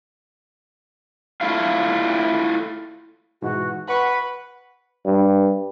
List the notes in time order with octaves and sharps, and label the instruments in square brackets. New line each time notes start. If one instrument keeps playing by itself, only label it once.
[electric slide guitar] A3 E4 F4 F5
[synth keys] G#2 B2 E3 [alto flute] F#4
[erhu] B4 [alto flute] F#5 [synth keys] B5 C#6
[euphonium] G2